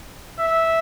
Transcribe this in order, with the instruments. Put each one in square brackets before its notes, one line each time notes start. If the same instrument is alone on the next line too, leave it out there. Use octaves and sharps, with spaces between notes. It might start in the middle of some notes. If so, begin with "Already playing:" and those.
[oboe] E5